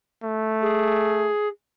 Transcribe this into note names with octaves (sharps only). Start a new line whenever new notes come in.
A3
G#4